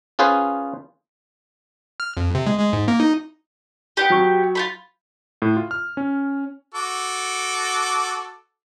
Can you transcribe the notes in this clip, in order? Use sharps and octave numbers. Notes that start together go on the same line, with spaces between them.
C#4 F4 G#4 B4 C5
F6
F2
C3
G#3
G#3
G#2
A#3
D#4
B3 D4 G4
F#3 C#6 G6
F4 G4 B5
A2
F4
F6
C#4
F#4 A4 D6